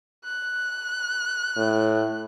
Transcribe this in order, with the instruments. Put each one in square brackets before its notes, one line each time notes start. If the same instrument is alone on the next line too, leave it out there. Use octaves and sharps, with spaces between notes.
[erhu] F#6
[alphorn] A2